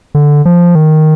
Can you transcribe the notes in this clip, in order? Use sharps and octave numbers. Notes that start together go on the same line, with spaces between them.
D3
F3
D#3